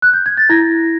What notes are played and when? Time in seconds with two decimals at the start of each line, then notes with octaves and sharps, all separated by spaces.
0.02 F#6
0.13 G6
0.26 G#6
0.37 A6
0.50 E4 G#6 A#6